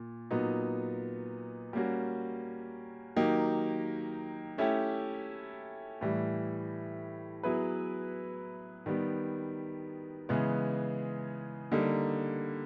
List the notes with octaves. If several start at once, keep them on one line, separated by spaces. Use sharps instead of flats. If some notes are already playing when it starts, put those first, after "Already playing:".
Already playing: A#2
A#2 F#3 B3 D#4
G3 A#3 C#4 F#4
D#3 F#3 A#3 D#4 G4
A3 C#4 E4 G4
A2 E3 G3
F#3 B3 E4 G#4 B4
D#3 G3 B3
C#3 E3 G#3 B3
D3 G3 A#3 D#4